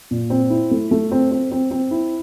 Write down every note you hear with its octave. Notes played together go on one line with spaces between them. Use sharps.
A#2
C4
E4
A3
A3
C4
C4
C4
C4
E4